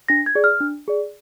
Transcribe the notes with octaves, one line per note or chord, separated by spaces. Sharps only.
D4 A#6
G#6
G#4 D5
F6
D4
G#4 D5